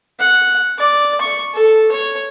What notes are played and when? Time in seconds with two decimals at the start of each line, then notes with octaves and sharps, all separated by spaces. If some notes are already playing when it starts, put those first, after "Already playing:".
0.19 F#5
0.78 D5
1.21 C#6
1.53 A4
1.91 C#5